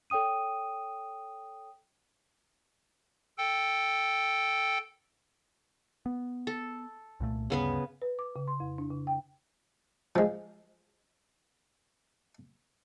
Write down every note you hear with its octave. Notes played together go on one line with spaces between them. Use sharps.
A4 C#5 G5 D#6 D#7
A4 G5
B3
A4
C2 A#2 A3
D2 G2 C#3 B3 B4
B4
D6
C#3
C6
F2
D4
C#3
G5
F3 G#3